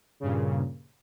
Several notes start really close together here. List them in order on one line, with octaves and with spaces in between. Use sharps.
C#3 G2 A#2